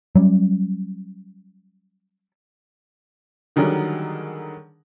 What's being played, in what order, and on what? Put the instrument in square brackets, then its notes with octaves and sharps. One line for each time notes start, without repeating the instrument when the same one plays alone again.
[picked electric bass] F#3 G3 C#4
[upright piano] D3 D#3 F#3 G3 G#4 A#4